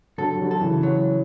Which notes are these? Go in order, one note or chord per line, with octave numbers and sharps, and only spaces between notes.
D3 F#3 A4
G3
D3 F#3
A4
C#3 E3
F#3